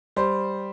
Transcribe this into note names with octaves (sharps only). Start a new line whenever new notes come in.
G3 C5